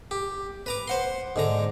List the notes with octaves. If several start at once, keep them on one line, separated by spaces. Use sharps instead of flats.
G4
B4 A#5 D6
C5 F#5 C6
G#2 D3 A#5